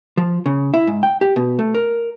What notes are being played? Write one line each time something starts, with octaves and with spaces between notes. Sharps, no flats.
F3
C#3
E4
G#2
G5
G4
B2
A3
A#4